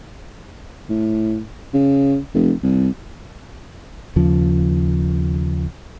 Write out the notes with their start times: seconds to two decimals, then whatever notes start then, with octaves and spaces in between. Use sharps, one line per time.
0.90 A2
1.74 C#3
2.34 F1
2.63 C2
4.16 D#2 C#3 F3